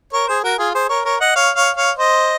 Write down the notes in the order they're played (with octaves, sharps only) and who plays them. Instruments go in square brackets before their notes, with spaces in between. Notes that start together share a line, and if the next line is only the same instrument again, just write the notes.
[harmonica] A#4 C#5
G#4 C5
F#4 A#4
F4 G#4
G#4 C5
A#4 C#5
A#4 C#5
D#5 F#5
C#5 F5
C#5 F5
C#5 F5
C5 D#5